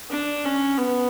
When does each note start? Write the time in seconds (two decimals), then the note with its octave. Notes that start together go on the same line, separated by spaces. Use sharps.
0.11 D4
0.45 C#4
0.78 B3